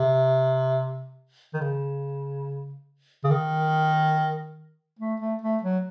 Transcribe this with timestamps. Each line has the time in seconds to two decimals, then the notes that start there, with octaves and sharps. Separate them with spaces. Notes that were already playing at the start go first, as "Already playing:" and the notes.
Already playing: C3
1.54 D#3
1.61 C#3
3.24 C#3
3.30 D#3
4.99 A3
5.20 A3
5.42 A3
5.63 F#3